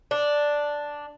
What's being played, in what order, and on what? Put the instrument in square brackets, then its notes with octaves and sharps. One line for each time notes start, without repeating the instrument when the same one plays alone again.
[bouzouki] D4